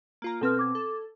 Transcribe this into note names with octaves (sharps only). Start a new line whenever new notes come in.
A#3 F4 A#5
B2 C4 A4 B4 F6
D6 G#6
A4